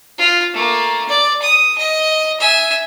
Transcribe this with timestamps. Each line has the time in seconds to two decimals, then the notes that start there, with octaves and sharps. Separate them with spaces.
0.18 F4
0.54 A3 A#3
1.09 D5
1.42 D#6
1.78 D#5
2.40 E5 G#5